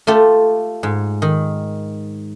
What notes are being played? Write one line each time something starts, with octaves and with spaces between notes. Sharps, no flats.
A3 F4 G4 A4
G#2
D#3